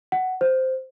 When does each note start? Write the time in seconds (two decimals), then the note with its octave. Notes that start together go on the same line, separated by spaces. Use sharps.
0.12 F#5
0.41 C5